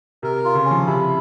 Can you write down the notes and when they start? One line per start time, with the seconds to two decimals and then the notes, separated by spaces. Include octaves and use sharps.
0.23 C3 A#4
0.45 F4
0.55 C#3
0.65 C#4
0.71 F3
0.87 C3 E4